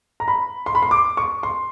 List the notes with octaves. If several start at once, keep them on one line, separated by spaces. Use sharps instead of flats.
A#5
B5
C6
B5
C6
D6
C#6
C6